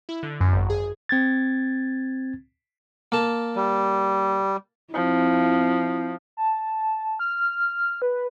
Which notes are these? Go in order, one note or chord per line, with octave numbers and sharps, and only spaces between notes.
E4
D3
F#2
G#1
G#4
C4 G#6 A6
A#3 A5
G3
F3 C4 E4
A5
F6
B4